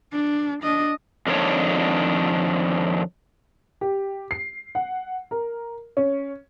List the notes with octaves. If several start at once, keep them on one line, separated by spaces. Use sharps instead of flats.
D4
D4 D#5
F2 D3 D#3 D4 C#5
G4
C7
F#5
A#4
C#4